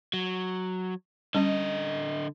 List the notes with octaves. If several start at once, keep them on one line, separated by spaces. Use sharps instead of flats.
F#3
D3 G3 C#4 D#5